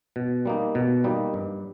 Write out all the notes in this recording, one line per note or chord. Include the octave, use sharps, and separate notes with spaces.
B2
G3 A#3 D#4
B2
G3 A#3 D#4
G2